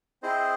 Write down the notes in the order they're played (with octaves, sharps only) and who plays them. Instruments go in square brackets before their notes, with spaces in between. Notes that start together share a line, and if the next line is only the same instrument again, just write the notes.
[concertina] C4 E4 G#4 C5 D#5